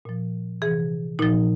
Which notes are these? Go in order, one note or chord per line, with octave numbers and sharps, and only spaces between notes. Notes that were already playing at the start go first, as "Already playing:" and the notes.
A#2 F3
C3 E3 G#4
A#2 F3 D#4